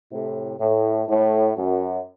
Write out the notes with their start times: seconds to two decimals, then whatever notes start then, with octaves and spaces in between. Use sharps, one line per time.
0.12 A2 C3
0.60 A2
1.08 A2
1.57 F#2